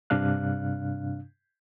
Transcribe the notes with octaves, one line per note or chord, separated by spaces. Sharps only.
G2 C3 D4 F5 F#6